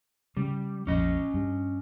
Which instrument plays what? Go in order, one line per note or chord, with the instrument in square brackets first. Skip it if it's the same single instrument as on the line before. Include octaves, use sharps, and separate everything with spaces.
[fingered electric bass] C#3 [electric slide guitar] G3
[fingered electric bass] A#1 F2 [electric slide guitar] C#4 D#5
[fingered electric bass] G2